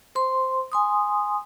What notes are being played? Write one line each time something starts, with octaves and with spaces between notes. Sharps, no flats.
C5 C6
G#5 C6 D#6